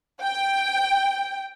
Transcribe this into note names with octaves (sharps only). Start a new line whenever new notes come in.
G5